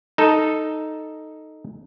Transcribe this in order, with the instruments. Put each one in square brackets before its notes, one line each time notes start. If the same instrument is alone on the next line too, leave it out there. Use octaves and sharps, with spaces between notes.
[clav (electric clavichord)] D#4 A4